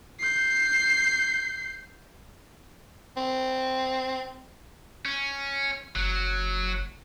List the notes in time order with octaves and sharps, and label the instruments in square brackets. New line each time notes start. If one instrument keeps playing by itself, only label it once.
[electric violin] G6 C7
[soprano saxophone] C4
[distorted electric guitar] C#4
[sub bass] F#1 [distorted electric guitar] F#3